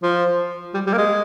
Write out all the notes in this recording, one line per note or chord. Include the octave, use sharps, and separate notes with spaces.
F3
G3
G3
A#3
G#3